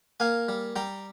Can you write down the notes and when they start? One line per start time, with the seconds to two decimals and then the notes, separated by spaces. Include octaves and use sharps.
0.20 A#3 F5 G#5
0.48 G3
0.76 G3 G5 A#5